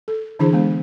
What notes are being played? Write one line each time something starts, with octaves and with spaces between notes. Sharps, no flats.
A4
D3 E3 D4 E4 G#4 C5
G#3 B3